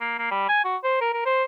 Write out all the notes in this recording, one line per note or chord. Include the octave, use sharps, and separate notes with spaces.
A#3
A#3
G3
G#5
F#4
C5
A#4
A#4
C5